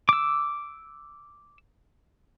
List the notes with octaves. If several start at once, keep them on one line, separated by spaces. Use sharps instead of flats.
D6 E6